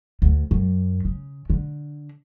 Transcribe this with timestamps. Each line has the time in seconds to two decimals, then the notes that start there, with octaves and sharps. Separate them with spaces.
0.22 D2
0.51 F#2
1.05 C#3
1.50 D3